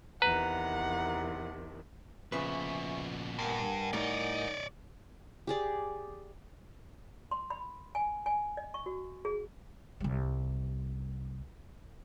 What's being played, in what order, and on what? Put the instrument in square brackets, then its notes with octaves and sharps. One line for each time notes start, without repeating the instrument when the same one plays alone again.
[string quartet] E2 C3 D#3 [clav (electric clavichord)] B4 [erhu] F#5 [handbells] A#5
[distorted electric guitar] A#2 B3 [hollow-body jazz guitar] C#3 F3 B4 [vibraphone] E5 G#5 C#6
[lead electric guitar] G2 [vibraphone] A#4 F#5 G#5
[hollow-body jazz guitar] A2 G3 [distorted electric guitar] D#4 [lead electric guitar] C#5 D5
[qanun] G4 G#4 D5
[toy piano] C6
B5
G#5
G#5
D#5
C#6
F#4
G#4
[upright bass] C2 G3